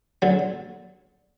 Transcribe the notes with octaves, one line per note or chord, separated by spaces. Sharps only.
D3 F#3